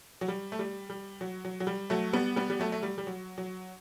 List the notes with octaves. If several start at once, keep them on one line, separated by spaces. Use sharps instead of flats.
F#3
G3
A3
G3
G3
F#3
F#3
F#3
G3
F#3 A3
G3 B3
G3 B3
G3
F#3 A3
A3
G3
G3
F#3
F#3